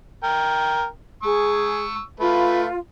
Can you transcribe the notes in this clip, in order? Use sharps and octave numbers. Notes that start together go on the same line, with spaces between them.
A#4 G5
G#4 C#6 E6
A3 F4 B4